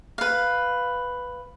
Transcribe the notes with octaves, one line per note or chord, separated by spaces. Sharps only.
B4 F5